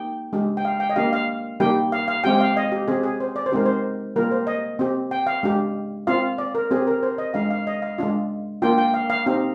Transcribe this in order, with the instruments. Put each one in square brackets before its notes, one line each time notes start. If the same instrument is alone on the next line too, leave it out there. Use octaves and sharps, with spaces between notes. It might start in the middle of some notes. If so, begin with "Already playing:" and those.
Already playing: [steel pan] A#3 D#4 G4 G5
G#3 D4 G4
G5
F5
G5
D#5
A#3 D4 G4 F5
F5
G3 A#3 D#4 G4 G5
F5
F5
G#3 C4 G4 G5
G5
F5
D#5
G4
C4 G4 G#4
G#4
C5
D5
C5
G#3 C4 D#4 G4 A#4
C5
G3 A#3 F4 A#4
C5
D#5
C4 G4
G5
F5
G#3 D4 G4
C4 F4 F5
D5
A#4
C4 G4 G#4
A#4
C5
D#5
G#3 D4 F4 F5
F5
D#5
F5
G#3 D4 F4
A#3 D4 F4 G5
G5
F5
F5
C4 D#4 G4